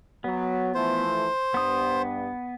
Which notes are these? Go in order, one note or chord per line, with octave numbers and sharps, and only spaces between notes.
F#3 B3
E3 F3 A3 C5
G2 B3 D#6